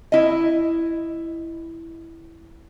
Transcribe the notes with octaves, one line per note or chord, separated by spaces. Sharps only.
E4 D#5